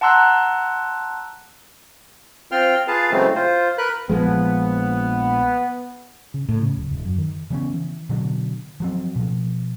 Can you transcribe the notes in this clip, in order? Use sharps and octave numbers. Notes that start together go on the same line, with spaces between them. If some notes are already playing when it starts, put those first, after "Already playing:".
F#5 A5 A#5 C6 E6 F#6
C4 F4 G5 C6 F6
F4 G#4 B4 F5 A5
C#3 E3 F#3 G#3 A3 C4
F4 C5
A#4 B4 B5 F#6
A#1 F3 G#3 B3
C#3
A2
C#3
D1
D#1
F#2
D#3
C#3 E3 B3 C#4
E3
B2 D3 F#3 D4
F3 F#3 C4
B2 F3